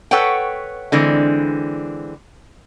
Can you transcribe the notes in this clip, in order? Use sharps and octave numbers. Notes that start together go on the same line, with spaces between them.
A4 B4 C#5 F#5 G5
D3 E3 G#3 C4